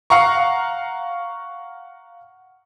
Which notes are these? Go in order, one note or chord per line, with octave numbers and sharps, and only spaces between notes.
F5 F#5 A#5 C#6